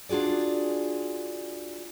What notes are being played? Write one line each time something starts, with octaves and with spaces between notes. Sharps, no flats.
D4 F4 F#4 G#4 D5